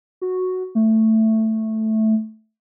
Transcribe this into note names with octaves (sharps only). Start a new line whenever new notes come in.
F#4
A3